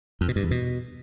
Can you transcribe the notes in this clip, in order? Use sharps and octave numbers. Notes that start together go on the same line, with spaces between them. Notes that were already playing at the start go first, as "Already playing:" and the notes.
F2
B2
G2
E2
B2